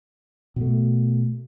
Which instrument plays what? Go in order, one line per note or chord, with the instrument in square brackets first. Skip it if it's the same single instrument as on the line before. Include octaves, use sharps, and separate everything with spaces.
[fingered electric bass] B2 A3